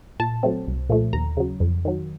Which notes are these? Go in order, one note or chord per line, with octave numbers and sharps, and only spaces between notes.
A#2 A5
F#3 A3 C4
C2
A#2 F3 A3
D#2 A#5
C#3 F#3
F2
D#3 F#3